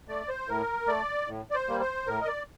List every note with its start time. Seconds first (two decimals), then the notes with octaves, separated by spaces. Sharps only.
0.08 A3 D5
0.29 C5
0.48 A2 A#4
0.88 A3 D5
1.28 A2
1.51 D5
1.55 C5
1.68 G3 A#3
1.80 C5
2.07 A2 A#4
2.21 D#5
2.27 D5